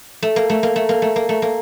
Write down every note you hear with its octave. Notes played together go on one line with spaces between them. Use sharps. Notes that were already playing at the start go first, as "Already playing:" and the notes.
A3
A#3
A3
A#3
A3
A#3
A3
A#3
A3
A#3